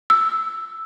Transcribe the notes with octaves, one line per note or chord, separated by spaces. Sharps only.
E6